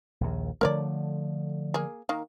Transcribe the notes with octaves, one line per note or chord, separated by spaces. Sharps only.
A#1 D#2
D3 F3 A3 A#4 C#5 D5
A#3 G#4
D#3 A#3